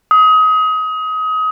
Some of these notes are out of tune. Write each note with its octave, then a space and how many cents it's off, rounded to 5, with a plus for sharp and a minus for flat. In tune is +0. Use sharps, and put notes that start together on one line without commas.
D#6 +25